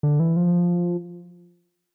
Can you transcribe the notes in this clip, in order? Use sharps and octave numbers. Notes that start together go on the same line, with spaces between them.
D3
E3
F3